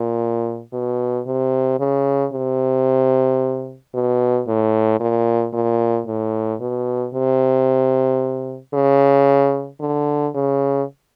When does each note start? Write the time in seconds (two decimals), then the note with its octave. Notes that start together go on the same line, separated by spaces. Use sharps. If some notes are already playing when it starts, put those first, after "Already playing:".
Already playing: A#2
0.73 B2
1.26 C3
1.79 C#3
2.33 C3
3.94 B2
4.48 A2
5.00 A#2
5.53 A#2
6.07 A2
6.60 B2
7.14 C3
8.74 C#3
9.80 D3
10.35 C#3